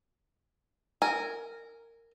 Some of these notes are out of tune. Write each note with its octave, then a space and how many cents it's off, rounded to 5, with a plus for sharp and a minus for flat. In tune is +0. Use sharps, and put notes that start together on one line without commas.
A#4 -15 G#5 +0